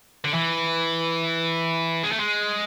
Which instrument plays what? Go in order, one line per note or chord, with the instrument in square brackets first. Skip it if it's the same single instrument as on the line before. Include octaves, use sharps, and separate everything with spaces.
[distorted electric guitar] D3
E3
G#3
A3
G#3